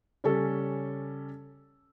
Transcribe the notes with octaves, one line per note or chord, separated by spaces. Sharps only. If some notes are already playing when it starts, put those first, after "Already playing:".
C#3 G3 C#4 A4